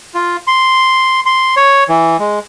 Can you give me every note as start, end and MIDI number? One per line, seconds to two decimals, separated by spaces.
0.14 0.36 65
0.47 1.20 84
1.26 1.55 84
1.57 1.84 73
1.89 2.17 52
2.19 2.39 56